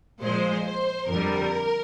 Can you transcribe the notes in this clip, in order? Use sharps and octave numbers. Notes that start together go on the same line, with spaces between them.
A#2 F3 G#3 C5
C5
F2 D3 G3 A#4